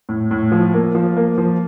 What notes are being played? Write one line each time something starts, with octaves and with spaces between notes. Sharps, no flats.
A2
A2
F3
A#3
F3
A#3
F3